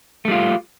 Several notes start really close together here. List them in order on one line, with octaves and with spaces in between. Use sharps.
A3 G3 F4